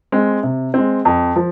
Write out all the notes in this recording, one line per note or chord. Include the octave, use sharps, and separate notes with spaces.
G#3 C4
C3
G#3 C4
F2
F3